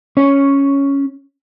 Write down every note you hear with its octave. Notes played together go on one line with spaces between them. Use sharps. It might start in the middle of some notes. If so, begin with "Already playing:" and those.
C#4 C#5